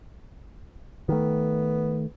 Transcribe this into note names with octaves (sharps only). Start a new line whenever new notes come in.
D#3 A3 B3